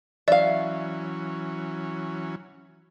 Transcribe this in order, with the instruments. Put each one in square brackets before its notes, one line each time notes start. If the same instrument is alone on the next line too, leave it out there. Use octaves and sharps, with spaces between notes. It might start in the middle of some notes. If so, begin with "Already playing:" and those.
[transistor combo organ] E3 F#3 C#4 [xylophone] D5 [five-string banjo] E5 F5